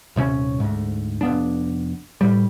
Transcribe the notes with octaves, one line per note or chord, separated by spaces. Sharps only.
D#1 C3 C4 C#4
D2 G#2
F1 B3 D4
A2 G3